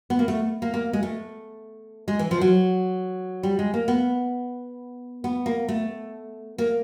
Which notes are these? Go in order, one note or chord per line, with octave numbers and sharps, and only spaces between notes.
B3
A#3
A3
A#3
A#3
G#3
A3
G#3
E3
F3
F#3
G3
G#3
A#3
B3
B3
A#3
A3
A#3